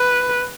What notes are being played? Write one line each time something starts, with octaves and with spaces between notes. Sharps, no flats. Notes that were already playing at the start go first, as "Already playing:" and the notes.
Already playing: B4